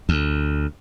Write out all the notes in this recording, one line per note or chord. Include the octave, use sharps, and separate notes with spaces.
D2